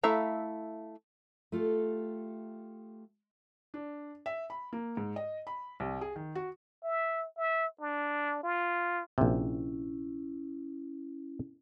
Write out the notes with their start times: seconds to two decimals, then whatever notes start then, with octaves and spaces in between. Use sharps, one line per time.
0.04 A3 E4 E5 F5 A#5
1.52 A3 F4 G4 A4
3.74 D4
4.26 E5
4.50 B5
4.73 A#3
4.97 G#2
5.16 D#5
5.47 B5
5.80 C2
6.01 G#4
6.16 D#3
6.35 F#4
6.83 E5
7.37 E5
7.81 D4
8.43 F4
9.18 A#1 C3 C#4 E4